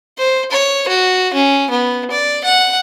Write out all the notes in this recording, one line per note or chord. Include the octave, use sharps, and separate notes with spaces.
C5
C#5
F#4
C#4
B3
D5
F#5